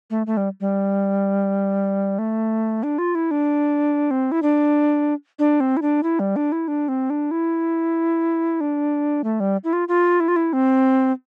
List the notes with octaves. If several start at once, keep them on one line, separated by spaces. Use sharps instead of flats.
A3
A3
G3
G3
A3
D4
F4
E4
D4
C4
E4
D4
D4
C4
E4
D4
E4
G3
D4
E4
D4
C4
D4
E4
D4
A3
G3
E4
F4
F4
E4
F4
E4
C4